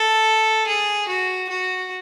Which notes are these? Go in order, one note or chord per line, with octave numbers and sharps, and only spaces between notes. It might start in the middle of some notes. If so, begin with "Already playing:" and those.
Already playing: A4
G#4
F#4
F#4